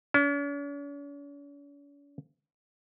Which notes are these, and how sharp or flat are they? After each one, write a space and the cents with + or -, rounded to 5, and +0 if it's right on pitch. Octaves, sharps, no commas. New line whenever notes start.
C#4 +45